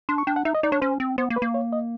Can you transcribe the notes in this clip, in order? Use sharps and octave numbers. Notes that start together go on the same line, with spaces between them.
D4 C6
C#6
D4 G5
F#5
D#4 E5
D#5
D#4 D5
D4 C#5
C#4 C5
C4
B3 C5
A#3
B4
A#3
C#5
D#5